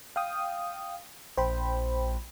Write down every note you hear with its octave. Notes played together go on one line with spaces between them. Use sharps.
F5 G5 D#6
A#1 C5 G5 B5